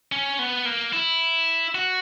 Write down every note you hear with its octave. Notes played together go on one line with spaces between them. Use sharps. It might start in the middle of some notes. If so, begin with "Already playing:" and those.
C#4
B3
A#3
E4
F#4